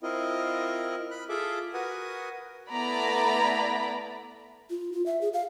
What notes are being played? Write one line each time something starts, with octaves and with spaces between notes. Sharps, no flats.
C4 E4 F4 A#4 D#5
B5 F#6
F4 G#4 A4 E5 D6
F#4 A#4 B4 F#5 G#5 D#6
A3 B3 E4 D5 A#5 B5
F4
F4
E5
G#4
F5